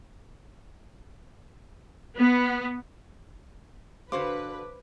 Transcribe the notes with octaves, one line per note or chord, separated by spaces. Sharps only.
B3
D3 F#4 B4 C5 F5 D6